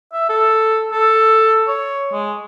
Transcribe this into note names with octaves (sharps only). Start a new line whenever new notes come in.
E5
A4
A4
C#5
G#3